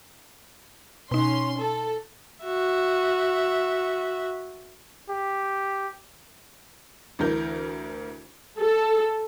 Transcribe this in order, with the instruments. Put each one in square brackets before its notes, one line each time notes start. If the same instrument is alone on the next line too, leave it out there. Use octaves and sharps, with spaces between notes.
[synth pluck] B2 D#4 [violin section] C#4 C6
[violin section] A4
[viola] F#4 E5
[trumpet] G4
[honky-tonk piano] D2 E3 A#4 G6
[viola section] A4